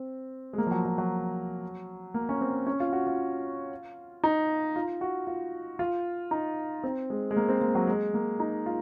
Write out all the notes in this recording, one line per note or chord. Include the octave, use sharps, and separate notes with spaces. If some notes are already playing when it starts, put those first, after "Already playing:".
Already playing: C4
G#3
A#3
F3
F#3
F3
F#3
A#3
C#4
C4
C#4
F4
F#4
F4
D#4
F4
F#4
F4
F4
D#4
C4
G#3
G#3
A#3
C4
A#3
F#3
G#3
A#3
D#4
F4